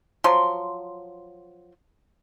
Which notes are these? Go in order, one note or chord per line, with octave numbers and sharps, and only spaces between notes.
F3 F#3 C6